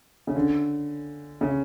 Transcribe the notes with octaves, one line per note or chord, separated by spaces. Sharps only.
C#3
D3
C#3